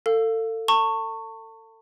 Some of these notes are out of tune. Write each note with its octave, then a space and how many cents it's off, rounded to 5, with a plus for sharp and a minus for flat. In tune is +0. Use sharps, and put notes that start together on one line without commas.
A4 +30 F5 +0
A5 +35 C#6 -5